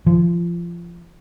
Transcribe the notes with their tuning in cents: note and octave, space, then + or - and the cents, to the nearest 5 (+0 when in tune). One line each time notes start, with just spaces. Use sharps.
F3 -25